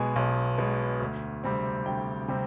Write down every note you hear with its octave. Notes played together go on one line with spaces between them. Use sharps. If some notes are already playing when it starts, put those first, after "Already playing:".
Already playing: B1 B2 G#3 B3 G#5
B1
B2 G#3 B3
D2
C3 G3 C4
D2 G5
C3 G3 C4